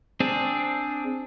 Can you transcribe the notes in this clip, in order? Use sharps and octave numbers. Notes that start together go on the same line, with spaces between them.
C4 D4 G#4